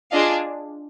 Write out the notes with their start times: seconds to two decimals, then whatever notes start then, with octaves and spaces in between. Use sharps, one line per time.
0.12 D4 F4 G#4 D#5 F5